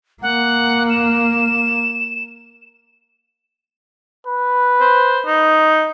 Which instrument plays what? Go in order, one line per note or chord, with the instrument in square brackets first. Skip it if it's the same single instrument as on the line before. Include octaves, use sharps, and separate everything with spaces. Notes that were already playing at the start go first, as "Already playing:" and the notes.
[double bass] A#3 [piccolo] F#5
[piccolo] E7
[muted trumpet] B4
[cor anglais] C5
D#4